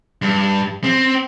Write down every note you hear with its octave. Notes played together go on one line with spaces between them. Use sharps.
G2
C4